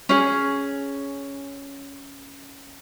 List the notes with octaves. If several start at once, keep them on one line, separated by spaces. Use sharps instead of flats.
C#4 G#4